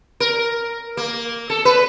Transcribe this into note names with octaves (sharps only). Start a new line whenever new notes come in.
A#4
A#3
A4
B4